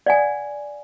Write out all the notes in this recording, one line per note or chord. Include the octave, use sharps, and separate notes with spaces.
D5 F#5 G#5